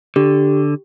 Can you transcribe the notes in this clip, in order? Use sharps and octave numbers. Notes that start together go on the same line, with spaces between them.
D3 G4